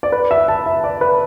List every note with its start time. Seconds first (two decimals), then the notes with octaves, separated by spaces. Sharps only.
0.03 D5
0.12 B4
0.31 E5
0.48 A5
0.66 E5
0.84 D5
1.01 B4